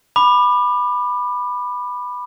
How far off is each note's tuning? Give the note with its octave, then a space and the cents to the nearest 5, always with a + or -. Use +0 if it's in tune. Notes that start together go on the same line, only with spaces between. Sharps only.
B5 +0 D6 +30